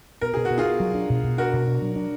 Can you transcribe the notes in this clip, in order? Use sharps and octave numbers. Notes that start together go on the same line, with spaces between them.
B2 A#4
B2 G#4
F#4
B2
F4 G#4
B2
F#3
D4
B2
B2
D4 F#4 A#4
B2
D4
F#3
D4